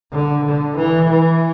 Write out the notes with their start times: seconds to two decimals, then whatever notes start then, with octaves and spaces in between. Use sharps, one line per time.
0.13 D3
0.45 D3
0.78 E3
1.10 E3